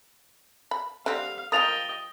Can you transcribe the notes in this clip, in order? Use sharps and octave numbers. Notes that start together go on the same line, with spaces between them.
B5
D3 G3 C4 F5
F3 F4 A#4 D#5 G5 D#6 A6 F7